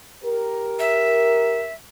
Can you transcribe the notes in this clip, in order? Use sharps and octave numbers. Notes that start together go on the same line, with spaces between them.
G4 A#4
E5